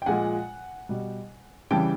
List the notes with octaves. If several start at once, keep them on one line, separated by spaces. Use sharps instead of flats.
G5
A#2 F3 G#3 F#5 G#5
B2 G3
C#3 E3 G3 G5 A5